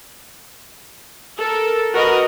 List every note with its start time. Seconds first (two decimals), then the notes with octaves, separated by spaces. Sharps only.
1.39 A4 A#4
1.94 F#4 A#4 B4 D#5